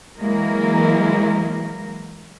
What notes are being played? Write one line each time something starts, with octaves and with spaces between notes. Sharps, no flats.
E3 F#3 G#3 A#3 E4 A#4